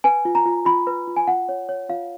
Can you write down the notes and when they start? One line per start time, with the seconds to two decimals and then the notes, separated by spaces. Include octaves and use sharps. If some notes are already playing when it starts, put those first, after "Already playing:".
0.04 B4 G#5
0.25 F4
0.35 A#5
0.46 F4
0.65 F4 B5
0.87 B4
1.07 F4
1.17 G#5
1.27 F4 F#5
1.49 C#5
1.69 C#5
1.89 F4 F5